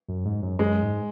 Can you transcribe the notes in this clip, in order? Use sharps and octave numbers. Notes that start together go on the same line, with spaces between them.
F#2
G#2
F#2
F#2 G#3
G#2